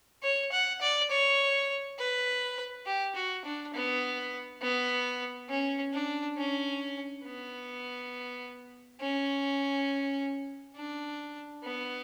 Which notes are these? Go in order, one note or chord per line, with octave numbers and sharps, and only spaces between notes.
C#5
F#5
D5
C#5
B4
G4
F#4
D4
B3
B3
C#4
D4
C#4
B3
C#4
D4
B3